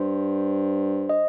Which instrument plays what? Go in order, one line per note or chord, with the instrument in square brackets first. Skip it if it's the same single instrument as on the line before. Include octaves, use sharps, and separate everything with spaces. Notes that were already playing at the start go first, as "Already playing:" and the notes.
Already playing: [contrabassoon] G2 [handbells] C5
[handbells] D#5